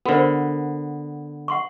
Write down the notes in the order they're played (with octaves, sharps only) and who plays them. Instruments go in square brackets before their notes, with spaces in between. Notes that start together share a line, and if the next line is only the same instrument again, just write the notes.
[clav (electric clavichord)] D3 B3 [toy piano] F#4 A#4 C5
[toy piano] F#5 C6 C#6